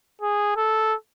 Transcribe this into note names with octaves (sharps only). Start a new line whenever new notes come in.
G#4
A4